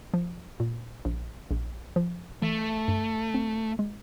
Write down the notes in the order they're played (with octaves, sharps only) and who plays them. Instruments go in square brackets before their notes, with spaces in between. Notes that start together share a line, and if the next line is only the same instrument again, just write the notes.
[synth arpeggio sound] F3
A#2
A#1
A#1
F3
[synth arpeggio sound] E3 [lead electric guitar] A3
[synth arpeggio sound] G2
C4
G#3